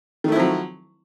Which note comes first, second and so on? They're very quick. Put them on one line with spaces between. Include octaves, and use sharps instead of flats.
D#3 A3 E4 F3 F#3